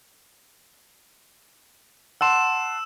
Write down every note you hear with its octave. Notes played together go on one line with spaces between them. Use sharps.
F#5 A5 C6 E6 E7